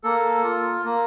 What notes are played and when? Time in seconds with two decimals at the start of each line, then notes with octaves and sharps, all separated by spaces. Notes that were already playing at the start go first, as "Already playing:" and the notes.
0.04 A#3 A4
0.44 F4
0.85 A#3